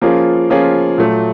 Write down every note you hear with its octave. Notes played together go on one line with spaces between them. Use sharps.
F3 A#3 C#4 F4 G#4
F3 A#3 C#4 F4 G#4
A#2 F#3 A3